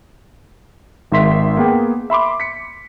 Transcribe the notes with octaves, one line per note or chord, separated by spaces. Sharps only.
G#1 D#3 G#3 E5 C6 B6
A#3 B3 G#4 G5
E5 B5 C6 D6
B6 C#7